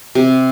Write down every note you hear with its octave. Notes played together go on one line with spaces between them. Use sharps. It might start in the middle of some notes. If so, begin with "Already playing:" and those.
C3